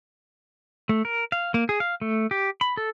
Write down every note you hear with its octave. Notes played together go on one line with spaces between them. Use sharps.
A3
A#4
F5
A#3
G#4
F5
A3
G4
B5
A4